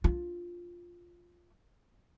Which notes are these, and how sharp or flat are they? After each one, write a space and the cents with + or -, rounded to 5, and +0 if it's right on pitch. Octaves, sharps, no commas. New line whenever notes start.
D4 +0 F4 +0